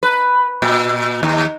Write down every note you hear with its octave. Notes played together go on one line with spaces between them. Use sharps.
B4
A#2
D#2